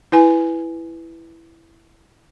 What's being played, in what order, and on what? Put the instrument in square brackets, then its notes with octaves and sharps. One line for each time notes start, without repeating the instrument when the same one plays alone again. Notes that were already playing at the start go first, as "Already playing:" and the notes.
[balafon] E4 B4 G#5